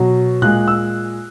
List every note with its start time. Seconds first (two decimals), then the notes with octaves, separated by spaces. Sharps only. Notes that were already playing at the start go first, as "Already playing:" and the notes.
Already playing: B2 F#3
0.42 A#2 G#3 F#6
0.68 E6